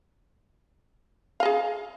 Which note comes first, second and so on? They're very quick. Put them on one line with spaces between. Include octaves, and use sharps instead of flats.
F5 D#5 G#4